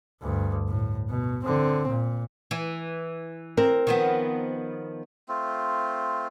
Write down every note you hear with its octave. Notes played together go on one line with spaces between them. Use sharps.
D2 G2
A2
B2
D3 C4
A#2
E3
C4 A#4
D#3 F3 B3
A3 C4 F4